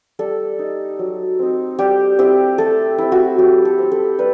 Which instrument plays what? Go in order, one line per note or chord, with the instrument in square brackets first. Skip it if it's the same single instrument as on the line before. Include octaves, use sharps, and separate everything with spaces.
[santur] G3 A4
D#4
F#3
C4 D#4
G3 G4
C4 E4 G4
A3 A4
C4 E4
F#4
F#3 G4
A4
C4 E4
A4
G3 B4